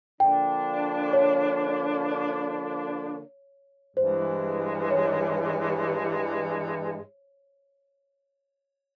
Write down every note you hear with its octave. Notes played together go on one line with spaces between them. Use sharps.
D3 F3 A#3 D4 G5
C#5
G2 E3 G#3 C5
C#5